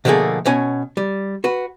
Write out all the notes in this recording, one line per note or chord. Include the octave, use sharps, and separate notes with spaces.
B2 D3 F3 A3 A#3 G#4
B2 C#4 C#5 G#5
G3
F#4 B4